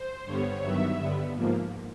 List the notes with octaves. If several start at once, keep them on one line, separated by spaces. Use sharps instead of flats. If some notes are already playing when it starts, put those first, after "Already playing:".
Already playing: C5
G2 D3 G3 B3 C#5
G2 D#3 F#3 B3 E5
G2 D3 G3 B3
G#2 F3 A#3